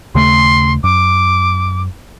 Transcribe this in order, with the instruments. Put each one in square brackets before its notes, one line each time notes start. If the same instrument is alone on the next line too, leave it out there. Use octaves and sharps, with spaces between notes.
[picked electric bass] D#2 C#3 A3 [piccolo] C6
[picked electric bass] F#2 [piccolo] D6